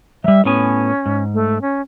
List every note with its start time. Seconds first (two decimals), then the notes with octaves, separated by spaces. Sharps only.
0.24 F#3 G3 E5
0.45 A2 B3 C#4 G#5
1.06 G#2
1.34 A3
1.61 C#4